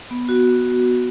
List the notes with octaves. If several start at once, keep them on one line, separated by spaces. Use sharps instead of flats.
B3
F#4